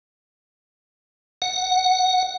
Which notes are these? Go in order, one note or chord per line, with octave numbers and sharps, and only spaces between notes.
F#5